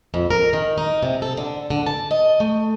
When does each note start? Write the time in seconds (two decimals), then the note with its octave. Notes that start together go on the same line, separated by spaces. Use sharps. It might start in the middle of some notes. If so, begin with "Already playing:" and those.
0.14 F2
0.30 A#4
0.53 D#3
0.78 D#4
1.03 C3
1.22 A4
1.37 D3
1.70 D3
1.86 A5
2.11 D#5
2.40 A3